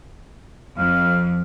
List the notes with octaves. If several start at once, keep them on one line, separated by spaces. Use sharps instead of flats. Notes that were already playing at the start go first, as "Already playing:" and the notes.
F2 F5